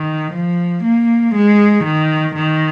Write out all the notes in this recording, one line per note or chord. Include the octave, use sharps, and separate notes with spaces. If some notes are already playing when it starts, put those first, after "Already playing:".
Already playing: D#3
F3
A#3
G#3
D#3
D#3